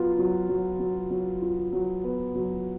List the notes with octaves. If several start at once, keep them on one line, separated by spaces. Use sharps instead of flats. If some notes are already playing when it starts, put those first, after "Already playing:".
Already playing: F#3 B3 F4
F#3
F#3
F#3
F#3
F4
F#3
B3
F#3